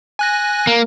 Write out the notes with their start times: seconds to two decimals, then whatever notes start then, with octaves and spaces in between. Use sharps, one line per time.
0.19 G#5 F#6 A#6
0.67 A#3